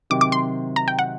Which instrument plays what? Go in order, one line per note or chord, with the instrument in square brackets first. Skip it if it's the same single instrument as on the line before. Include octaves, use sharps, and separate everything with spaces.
[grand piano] C3 D#3 F#3 C4 F#4 [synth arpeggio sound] D6
[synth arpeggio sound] D6
C6
A#5
G5
F#5